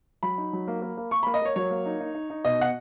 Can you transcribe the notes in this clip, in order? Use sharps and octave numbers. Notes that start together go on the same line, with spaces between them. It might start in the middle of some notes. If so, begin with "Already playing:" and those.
F#3 B5
D#4
F#3
A#3
A#3
A#3
A#3 C#6
A#3 B5
D#5
A#3 C#5
F#3 C#5
A#3
D#4
D#4
D#4
D#4
B2 D#5
B2 F#5